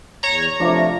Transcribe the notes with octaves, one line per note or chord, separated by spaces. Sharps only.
E2 C#5 A#5
C3 F3 A3 D4 F5